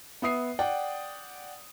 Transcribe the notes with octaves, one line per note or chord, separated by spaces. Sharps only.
B3 E5 D#6 C7
D5 F#5 G5